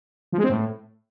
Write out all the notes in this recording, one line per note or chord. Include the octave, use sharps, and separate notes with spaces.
F3
G#3
C4
A2